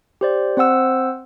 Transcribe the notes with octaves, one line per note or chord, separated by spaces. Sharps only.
G4 C5 D5
C4 C5 F#5 E6